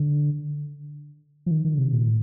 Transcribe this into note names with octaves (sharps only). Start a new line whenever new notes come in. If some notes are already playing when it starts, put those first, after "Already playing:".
Already playing: D3
F3
D#3
D#3
D3
C3
A#2
A2